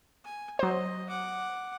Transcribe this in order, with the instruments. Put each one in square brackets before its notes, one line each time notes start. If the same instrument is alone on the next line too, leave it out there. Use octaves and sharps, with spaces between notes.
[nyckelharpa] G#5
[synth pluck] F#3 C5 [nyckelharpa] D#5
[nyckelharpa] F#5 D6